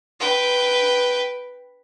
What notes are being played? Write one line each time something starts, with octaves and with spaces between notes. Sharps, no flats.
B4 G5